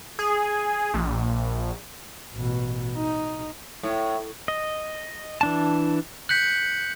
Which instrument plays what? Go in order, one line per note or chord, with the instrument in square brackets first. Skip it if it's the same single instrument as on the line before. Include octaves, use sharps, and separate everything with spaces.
[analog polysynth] G#4
A#1
[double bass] A1 B2
D#4
[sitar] A2
[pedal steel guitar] D#5
E3 D4 A5
[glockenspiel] F#6 G6 [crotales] B6 C#7 F#7